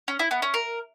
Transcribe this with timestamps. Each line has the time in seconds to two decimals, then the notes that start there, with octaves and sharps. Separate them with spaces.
0.08 C#4
0.19 E4
0.31 B3
0.42 C#4
0.54 A#4